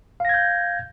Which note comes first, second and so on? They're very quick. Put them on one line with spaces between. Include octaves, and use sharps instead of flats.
F5 A#6 G#6 G6